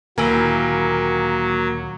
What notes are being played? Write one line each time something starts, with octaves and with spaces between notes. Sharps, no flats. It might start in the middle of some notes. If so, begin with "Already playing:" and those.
D2 A#2 D#3 F#3 A#3 E4 G5 G#5